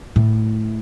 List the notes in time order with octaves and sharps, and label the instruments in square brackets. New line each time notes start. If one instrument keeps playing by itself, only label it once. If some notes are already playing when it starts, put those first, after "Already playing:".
[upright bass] A2